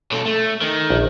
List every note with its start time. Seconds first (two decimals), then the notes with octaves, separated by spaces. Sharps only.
0.11 B2 A4
0.25 A3
0.61 D#3
0.90 A#1